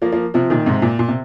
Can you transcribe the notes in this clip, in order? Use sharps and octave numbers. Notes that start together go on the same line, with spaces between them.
F3 A#3
F3 A#3
C3 F3
A#2 D#3
G#2 C3
A#2
A#2
C3